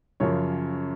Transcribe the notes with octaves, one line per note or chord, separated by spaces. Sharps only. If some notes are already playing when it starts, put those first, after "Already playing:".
F#2 C#3 F3 C#5